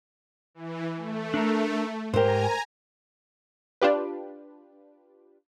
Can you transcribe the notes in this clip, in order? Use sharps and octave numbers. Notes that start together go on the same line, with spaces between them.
E3
A3
D4 A4 A#4
G#2 G4 A#4 C5 G#5 A#5
D4 F4 G4 B4